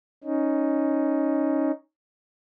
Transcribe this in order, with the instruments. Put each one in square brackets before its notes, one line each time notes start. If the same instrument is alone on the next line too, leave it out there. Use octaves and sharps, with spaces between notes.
[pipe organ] C#4 D#4